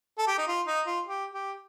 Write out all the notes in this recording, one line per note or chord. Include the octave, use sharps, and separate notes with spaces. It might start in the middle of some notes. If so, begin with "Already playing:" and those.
A4
G4
D#4
F4
D#4
F4
G4
G4